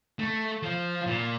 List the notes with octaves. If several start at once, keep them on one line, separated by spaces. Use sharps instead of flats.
A3
F3
A#2